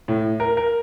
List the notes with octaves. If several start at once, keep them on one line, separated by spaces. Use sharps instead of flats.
A2
A#4
A#4